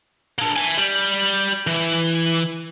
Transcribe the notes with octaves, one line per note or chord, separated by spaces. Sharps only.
A#3 D4
E5 G#5
G3
E3